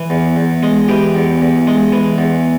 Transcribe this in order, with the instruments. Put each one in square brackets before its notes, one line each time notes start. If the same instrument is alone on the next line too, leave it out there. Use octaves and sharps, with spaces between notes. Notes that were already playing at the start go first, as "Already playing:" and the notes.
Already playing: [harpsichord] E3
E2
E2
G#3
E3 G4
E2
E2
G#3
E3
E2